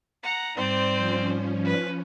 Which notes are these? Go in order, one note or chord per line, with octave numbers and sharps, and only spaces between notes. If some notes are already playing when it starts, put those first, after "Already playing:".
F#5 A#5
G#2 G3 C4 C5 D5
F3 C#4
B4